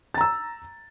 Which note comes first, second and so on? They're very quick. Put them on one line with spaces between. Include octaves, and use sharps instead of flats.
A6 A#5 E6